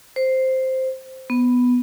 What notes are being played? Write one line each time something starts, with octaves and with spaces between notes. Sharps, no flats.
C5
B3